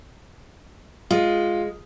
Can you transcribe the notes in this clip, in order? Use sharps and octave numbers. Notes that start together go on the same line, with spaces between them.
G#3 F4